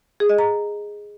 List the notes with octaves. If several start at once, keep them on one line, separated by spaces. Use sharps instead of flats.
G#4
D#5
A#5